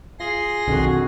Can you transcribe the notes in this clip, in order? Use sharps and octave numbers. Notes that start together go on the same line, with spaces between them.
F4 G#4 C6 A#6
B1 F2 D3 D#3 F#4